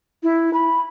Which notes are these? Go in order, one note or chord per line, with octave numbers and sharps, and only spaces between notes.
E4
B5